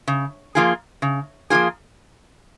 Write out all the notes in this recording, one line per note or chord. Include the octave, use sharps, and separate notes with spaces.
C#3
F3 A#3 F4 G#4
C#3
F3 A#3 F4 G#4